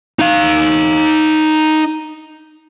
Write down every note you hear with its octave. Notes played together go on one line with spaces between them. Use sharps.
D#4 F5